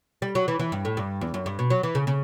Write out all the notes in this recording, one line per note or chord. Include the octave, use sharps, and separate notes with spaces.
G3
F#3
E3
E3
G2
A2
G2
E2
F#2
G2
B2
F#3
E3
C#3
C#3